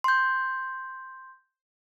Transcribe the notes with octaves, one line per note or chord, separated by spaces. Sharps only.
C6 G6